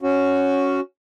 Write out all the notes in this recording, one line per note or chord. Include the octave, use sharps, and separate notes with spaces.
C#4 F#4